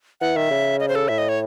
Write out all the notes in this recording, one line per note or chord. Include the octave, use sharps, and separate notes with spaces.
E3 F#5
D#3 E5
C#3
D#5
C5
A4
A2 E5
D#5
C#5